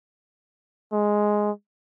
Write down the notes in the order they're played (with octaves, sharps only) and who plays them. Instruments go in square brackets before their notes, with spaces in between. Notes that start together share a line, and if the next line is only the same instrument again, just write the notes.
[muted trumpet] G#3